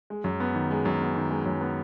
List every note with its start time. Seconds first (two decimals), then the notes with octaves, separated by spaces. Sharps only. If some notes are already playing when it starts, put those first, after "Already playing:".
0.10 G#3
0.24 F#2
0.40 B3
0.55 D#3
0.71 G#3
0.85 F#2
1.00 B3
1.15 D#3
1.30 G#3
1.46 F#2
1.61 B3